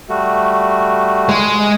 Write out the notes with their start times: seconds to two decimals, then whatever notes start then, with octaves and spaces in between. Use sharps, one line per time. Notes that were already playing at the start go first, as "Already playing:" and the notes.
0.09 G3 A3 F#4
1.29 G#3